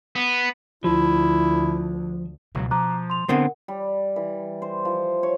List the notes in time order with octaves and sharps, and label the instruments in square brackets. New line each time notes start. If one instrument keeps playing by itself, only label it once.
[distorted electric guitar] B3
[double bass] D2 [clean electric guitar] F3 [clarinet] E4
[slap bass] C#2 F#3 [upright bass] B2
[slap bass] F3 [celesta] A#5 D6 F#6
[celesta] C6 F7
[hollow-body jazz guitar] D3 C4 [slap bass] B3 [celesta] A#4 F#5
[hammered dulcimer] G3
E3
C5
F3
C#5